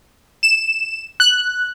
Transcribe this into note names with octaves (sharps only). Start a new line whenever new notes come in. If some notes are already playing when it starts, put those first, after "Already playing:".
E7
F#6